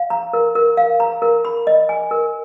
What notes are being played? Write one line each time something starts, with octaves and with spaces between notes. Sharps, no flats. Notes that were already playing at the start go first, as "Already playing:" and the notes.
Already playing: F5
A#5
A#4
A#4
F5
A#5
A#4
B5
D#5
G#5
A#4